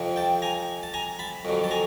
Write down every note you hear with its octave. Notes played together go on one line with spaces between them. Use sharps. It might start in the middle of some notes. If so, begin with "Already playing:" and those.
Already playing: F2 C3 F3
G5 A5
G#5 A#5
A5
G#5 A#5
A5 B5
F2 D3 F#3
A5
G#5 A#5